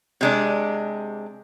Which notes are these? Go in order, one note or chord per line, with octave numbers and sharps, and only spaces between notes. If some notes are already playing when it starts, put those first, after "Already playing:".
C3 G#3 D4